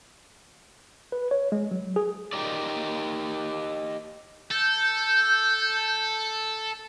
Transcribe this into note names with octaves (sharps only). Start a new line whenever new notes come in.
B4
C#5
G#3
F#3
G#4
D#4 G4 A#4 D5
A4 G6